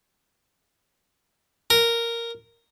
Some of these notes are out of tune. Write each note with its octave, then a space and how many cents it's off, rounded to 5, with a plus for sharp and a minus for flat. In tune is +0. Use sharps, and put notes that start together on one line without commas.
A#4 -5